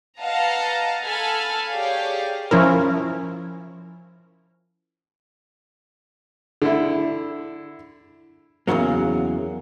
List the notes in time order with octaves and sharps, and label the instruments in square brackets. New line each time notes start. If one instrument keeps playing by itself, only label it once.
[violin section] B4 D#5 F5 F#5 A5 A#5
A4 G#5 B5 F6
G4 G#4 C#5 D5 F5
[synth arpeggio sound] F3 C#4 E4 A#4
[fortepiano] D3 E4
[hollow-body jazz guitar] E2 A2 C#3 F#3 A#3